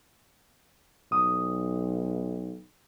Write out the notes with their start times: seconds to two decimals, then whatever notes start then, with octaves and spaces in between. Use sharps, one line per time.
1.12 B1 D#6